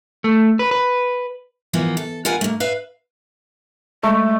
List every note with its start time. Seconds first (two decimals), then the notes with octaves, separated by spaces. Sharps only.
0.24 A3
0.59 B4
0.71 B4
1.73 E3 F3 A#3 B3
1.97 A4
2.25 F4 A#4 B4 F#5 G#5
2.41 A3 A#3
2.60 B4 E5 F5
4.03 G#3 A3